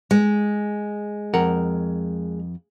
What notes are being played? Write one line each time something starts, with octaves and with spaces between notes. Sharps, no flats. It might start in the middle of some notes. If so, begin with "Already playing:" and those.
G#3
F2 A#4 F#5